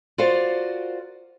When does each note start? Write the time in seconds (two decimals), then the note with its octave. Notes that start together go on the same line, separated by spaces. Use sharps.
0.18 F4 F#4 A#4 C5 D5 F5